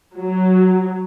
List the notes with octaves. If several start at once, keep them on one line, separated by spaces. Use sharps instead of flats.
F#3